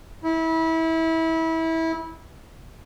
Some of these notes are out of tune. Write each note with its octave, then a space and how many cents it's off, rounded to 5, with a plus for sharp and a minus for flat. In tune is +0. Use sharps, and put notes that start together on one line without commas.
E4 -25